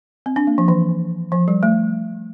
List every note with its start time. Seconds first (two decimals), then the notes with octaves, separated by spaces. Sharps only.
0.26 C4
0.36 D4
0.47 A#3
0.58 F3
0.68 E3
1.32 F3
1.48 G3
1.63 A3